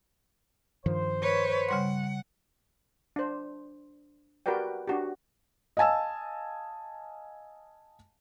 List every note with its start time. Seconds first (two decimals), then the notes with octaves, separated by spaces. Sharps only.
0.86 G2 D#3 F3 C5
1.22 B4 C#5
1.69 C#3 G3 F#5 C6
3.16 D4 C5
4.46 F#4 G4 A#4 B4 D5 G5
4.87 D4 F#4 G4
5.77 D#5 F5 G#5 A5 E6